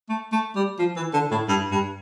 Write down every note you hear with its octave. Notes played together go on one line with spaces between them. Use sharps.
A3
A3
G3
F3
E3
D3
A2
G2
G2